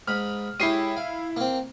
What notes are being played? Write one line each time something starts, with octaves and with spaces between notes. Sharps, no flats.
G#2 B5 F6
G#3 E4 G4 C#5 C7 D#7
F5
A#3 C4